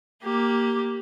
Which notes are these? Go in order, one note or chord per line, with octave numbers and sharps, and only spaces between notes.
A#3 G4